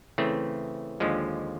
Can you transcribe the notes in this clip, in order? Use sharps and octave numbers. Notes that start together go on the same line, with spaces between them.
C#3 E3 A3 C4
D#2 D3 F3 G#3